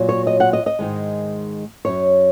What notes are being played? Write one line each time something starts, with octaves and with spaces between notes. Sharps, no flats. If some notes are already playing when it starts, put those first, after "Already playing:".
Already playing: A#2 F#3
C#5
D#5
F#5
D#5
D#5
G#2 D#3 G#3
F#2 F#3 C#5